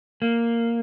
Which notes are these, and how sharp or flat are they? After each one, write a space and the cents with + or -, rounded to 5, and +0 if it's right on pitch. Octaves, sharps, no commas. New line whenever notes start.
A#3 -5